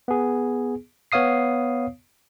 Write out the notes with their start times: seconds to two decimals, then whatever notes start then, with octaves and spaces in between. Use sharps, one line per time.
0.08 B3 G#4
1.12 B3 C#5 F5 D#6 C7